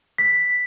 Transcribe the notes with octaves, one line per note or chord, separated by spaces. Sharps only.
B6